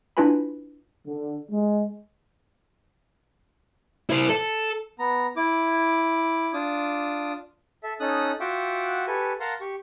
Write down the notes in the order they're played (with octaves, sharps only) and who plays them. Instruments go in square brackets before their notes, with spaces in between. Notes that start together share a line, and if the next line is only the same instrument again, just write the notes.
[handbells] D4 E4 F4 B4 G#5 B5
[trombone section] D3
G#3
[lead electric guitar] E4 C5
A4
[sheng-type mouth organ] B3 A#5
E4 D6
D4 F4 D6 D#6
A4 E5
C#4 D#4 A4 D#6 F#6
F4 F#4 E5 F#5 G5 D6
G4 A4 B4 G#5 C#6
A#4 F5 F#5 A5 A#5 C6
G4 C#6